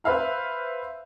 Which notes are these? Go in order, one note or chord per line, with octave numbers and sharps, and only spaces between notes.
B4 C5 E5 F5 B5